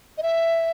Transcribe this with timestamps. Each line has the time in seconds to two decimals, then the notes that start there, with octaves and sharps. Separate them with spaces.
0.18 D#5
0.23 E5